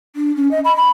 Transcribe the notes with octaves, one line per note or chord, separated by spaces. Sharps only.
D4
C#4
D#5
B5
B5